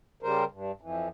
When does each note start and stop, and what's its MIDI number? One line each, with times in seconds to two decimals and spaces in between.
0.23 0.44 49
0.23 0.44 55
0.23 0.44 70
0.23 0.44 72
0.52 0.72 43
0.81 1.08 41
0.81 1.08 52